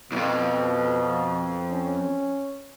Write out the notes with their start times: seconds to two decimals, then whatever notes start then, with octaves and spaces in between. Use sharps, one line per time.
0.12 B1 F2 B2
1.72 C#4